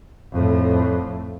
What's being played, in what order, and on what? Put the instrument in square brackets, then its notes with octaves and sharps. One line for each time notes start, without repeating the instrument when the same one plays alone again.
[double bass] F2 A2